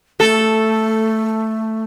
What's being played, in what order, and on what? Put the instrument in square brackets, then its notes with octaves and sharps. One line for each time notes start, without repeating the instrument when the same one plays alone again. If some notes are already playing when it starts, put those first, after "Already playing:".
[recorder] A3 [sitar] A4